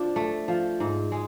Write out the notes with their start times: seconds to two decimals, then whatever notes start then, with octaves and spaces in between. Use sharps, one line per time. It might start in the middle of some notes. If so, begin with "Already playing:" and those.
Already playing: F3 D4
0.16 A3
0.48 F3
0.80 G#2
1.12 G#3